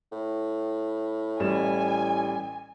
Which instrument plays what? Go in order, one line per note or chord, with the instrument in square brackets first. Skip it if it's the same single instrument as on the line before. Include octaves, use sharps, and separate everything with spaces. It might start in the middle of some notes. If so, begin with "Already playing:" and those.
[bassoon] A2
[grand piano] A1 G3 E7 [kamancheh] G#5